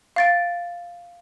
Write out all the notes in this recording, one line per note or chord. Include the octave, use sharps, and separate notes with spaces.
F5 A6 D7